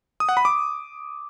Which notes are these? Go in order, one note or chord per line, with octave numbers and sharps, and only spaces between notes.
D#6
F#5
B5
D6